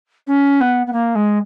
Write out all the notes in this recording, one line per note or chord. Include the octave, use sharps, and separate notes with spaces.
C#4
B3
B3
A#3
G#3